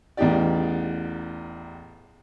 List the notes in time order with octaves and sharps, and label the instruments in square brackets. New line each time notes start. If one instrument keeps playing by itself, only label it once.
[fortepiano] A1 E2 D#4 G4 D5